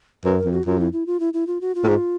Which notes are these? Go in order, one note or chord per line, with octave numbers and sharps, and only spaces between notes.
F#2 B4
A#4
F2
F#4
F#2 F4
F2 E4
E4
F4
E4
E4
F4
F#4
F4
A2
G#2